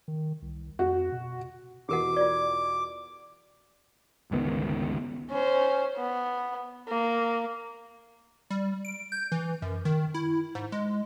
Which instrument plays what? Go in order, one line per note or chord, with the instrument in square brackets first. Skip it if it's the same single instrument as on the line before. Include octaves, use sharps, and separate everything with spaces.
[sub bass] D#3
C2
[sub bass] F2 [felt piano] F#4
[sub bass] B2
[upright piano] E2 B2 F#4 [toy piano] G4 A#4 F#5 [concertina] D6
[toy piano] F4 D5
[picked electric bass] G1 C#2 D#3 B3
[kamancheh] C#4 C5
B3
A#3
[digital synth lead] G3
D7
G6
E3
F#2
D#3
E4
G#2
G#3